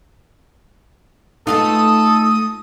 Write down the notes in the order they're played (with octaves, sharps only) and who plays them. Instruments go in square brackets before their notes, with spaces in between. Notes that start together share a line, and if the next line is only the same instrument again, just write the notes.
[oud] A3 B3 F4 [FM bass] D#4 [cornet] A4 [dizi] D#6